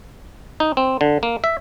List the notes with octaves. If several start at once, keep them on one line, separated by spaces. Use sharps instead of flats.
D#4
C4
D3
A#3
E5